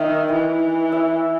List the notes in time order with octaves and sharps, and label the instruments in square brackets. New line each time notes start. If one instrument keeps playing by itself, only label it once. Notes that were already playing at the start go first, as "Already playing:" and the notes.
Already playing: [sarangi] D#3 [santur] E5
[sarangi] E3
[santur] E5